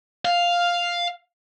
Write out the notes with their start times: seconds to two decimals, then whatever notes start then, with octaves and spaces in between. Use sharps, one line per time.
0.25 F5